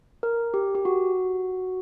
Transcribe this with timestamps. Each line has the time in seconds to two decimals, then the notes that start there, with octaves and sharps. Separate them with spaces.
0.23 A#4
0.54 G4
0.75 G4
0.85 F#4